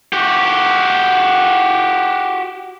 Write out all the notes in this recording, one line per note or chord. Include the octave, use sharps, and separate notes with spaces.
F#4 G4